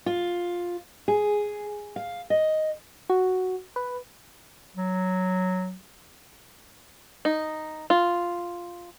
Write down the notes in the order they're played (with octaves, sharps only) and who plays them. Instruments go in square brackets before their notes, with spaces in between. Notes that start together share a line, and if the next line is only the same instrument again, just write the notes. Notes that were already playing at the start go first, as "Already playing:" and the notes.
[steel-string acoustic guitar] F4
G#4
F5
D#5
[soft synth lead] F#4
B4
[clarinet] F#3
[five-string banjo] D#4
F4